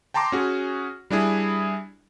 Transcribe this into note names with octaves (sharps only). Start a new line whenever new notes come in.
G5 A5 A#5 C6 D6
C#4 F#4 G#4
G3 D4 E4 G#4